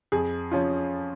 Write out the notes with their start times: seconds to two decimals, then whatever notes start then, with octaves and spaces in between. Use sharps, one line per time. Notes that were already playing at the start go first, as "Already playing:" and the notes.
0.12 F2 G#4
0.51 F3 C#4 F4